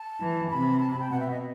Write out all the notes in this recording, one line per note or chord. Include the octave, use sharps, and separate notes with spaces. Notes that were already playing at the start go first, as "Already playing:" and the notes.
Already playing: A5
E3
C3 B5
A5
B5
G5
B2 F#5
E5
D#5